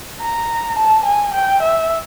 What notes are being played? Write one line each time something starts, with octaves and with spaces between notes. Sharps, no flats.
A#5
A5
G#5
G5
E5